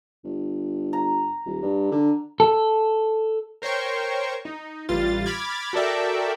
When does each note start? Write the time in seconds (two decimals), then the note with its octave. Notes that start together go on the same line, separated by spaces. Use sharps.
0.25 G1
0.93 A#5
1.46 D#1
1.63 G2
1.92 D3
2.40 A4
3.62 A#4 C5 C#5 G5 C#6
4.45 D#4
4.89 A1 E3 G3 F4 A6
5.26 B5 D6 F6 G#6 A6
5.73 F#4 A4 A#4 D5 E5 G5